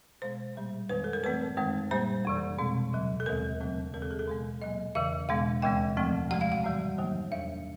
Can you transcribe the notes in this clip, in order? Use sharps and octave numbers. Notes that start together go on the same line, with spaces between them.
B2 G#3 B3 C5
A#2 G3 A#3
F2 C3 D#3 G#3 B3 B4
A4
A#4
G#2 E3 A3 C4 B4
F#2 D#3 G#3 C4
A#2 G3 A#3 C5
F2 C3 E3
B2 G#3 C4
D#2 C#3 F#3
A4
D#2 D#3 G#3 B3 A#4
E2 C#3 F#3 A3 C4
D#2 C#3 E3 G#3 C4 A#4
A4
G#4
A4
B2 G#3 B3
A#2 F#3 A#3 D#5
E2 C#3 E3 E5
E2 B2 G#3 B3 F#5
D#2 C#3 E3 G#3 B3 G5
F2 C3 F3 A3 C4
A2 F3 G#3 F#5
F5
F#5
A2 E3 G3 B3
F#2 D#3 F#3 A#3
E2 C3 E3 E5